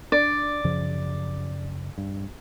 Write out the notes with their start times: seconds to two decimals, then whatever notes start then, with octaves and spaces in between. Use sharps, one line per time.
0.12 D4 D5
0.64 F#2 C#3 F3
1.98 G2